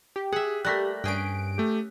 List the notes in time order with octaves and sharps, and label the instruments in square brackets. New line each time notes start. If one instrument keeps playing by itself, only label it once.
[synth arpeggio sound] G4
[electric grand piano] G#4 [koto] E5 F#5
[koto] G3 A3 A#3 [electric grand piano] F#6 A#6 B6
[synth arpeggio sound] G2 D7 [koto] C#4 G#4 G5
[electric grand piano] A3 G4